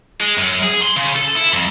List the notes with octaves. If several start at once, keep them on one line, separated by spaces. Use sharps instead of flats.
G#3
F#2
G#4
C6
C#3
A4
E4
F2